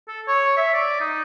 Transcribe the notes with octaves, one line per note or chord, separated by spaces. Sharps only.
A4
C#5
E5
D5
D#4